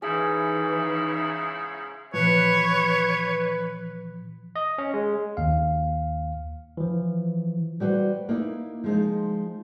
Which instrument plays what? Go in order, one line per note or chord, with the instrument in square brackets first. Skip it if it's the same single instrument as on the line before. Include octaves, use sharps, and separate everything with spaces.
[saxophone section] G#2 C#3 E4 [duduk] E3 [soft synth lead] D#4 [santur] G#4
[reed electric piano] A#2 E3 F3 [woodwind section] B4 [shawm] C#5
[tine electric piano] D#5
C#4
G#3
D#2 F5
E3 F3
[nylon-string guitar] G3 F#4 B4 C5
A#3 D#4 E4
F3 G#3 D#4